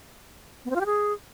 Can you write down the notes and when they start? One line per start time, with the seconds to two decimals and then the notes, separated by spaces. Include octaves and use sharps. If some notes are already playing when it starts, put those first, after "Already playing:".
0.65 B3
0.70 C4
0.75 F4
0.80 G4
0.86 G#4